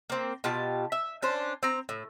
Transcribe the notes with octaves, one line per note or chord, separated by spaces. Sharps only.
A#3 C4
B2 F4 G4 A5
E5
C#4 D4 C5
C4 A#5
A2